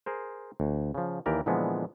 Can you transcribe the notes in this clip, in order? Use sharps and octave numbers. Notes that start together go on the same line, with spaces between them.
G#4 A#4 C5
D2
C#3 F3
D#2 E3 G4 A#4 D5
A#2 D3 E3 F3 G#3 B3